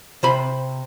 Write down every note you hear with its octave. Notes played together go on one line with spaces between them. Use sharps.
C3 C5 B5